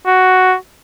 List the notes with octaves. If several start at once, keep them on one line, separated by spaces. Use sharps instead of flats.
F#4